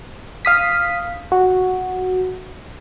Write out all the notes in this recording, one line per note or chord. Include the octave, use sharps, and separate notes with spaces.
F5 D#6 B6
F#4